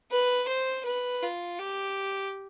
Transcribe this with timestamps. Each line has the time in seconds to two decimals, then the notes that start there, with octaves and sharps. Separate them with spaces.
0.11 B4
0.48 C5
0.86 B4
1.23 F4
1.60 G4